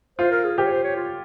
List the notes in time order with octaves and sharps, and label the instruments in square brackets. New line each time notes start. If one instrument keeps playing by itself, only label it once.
[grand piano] F4 [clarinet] C5
[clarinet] A#4
G#4
[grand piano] G4 [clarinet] C5
[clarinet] C#5
C5
C#5
F4